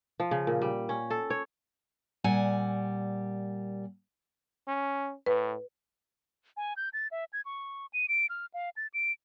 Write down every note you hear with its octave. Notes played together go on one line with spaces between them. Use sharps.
F3
C#3
A#2
G3
C#4
A4
C#5
A#2 G3 F#5 G#5
C#4
A2 B4
G#5
G6
A6
E5
G#6
C#6
D#7
D7
F6
F5
A6
D7